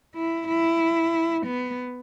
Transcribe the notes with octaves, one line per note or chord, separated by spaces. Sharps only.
E4
E4
B3